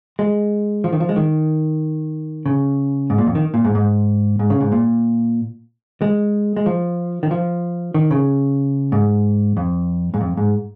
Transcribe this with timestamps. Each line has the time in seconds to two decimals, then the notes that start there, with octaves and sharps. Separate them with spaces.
0.19 G#3
0.84 F3
0.93 D#3
1.00 F3
1.09 G#3
1.16 D#3
2.46 C#3
3.10 G#2
3.18 A#2
3.27 F2
3.35 D#3
3.54 A#2
3.64 G#2
3.75 G#2
4.39 G#2
4.50 C#3
4.61 G#2
4.72 A#2
6.02 G#3
6.57 G#3
6.66 F3
7.23 D#3
7.31 F3
7.94 D#3
8.11 C#3
8.92 G#2
9.57 F2
10.14 G#2
10.21 F2
10.37 G#2